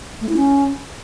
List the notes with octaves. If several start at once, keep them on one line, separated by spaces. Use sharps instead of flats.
A3
E4
C#4